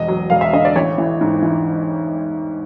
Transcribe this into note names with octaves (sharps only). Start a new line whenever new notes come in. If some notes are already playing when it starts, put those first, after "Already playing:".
Already playing: E1 D#5
F#3
E1 F5
E5
D3 D#5
D5
A1 C#5
E3
G#2
E3